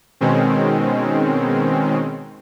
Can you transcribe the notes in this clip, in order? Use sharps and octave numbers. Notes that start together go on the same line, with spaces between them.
B2 D#3 G#3 C4 C#4